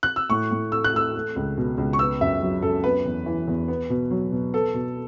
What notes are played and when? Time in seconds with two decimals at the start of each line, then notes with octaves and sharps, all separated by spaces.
0.03 F#6
0.16 E6
0.30 A2 C#6
0.51 A2
0.72 A3 E6
0.84 F#6
0.93 A3 E6
1.15 A3
1.36 C#2
1.58 B2
1.78 C#2
1.93 C#6
1.99 B3 E6
2.21 F#2 E5
2.42 F#3
2.62 F#2 A4
2.84 B3 B4
3.05 E2
3.26 E3
3.48 E2
3.68 B3
3.90 B2
4.11 F#3
4.32 B2
4.54 B3 A4
4.74 B2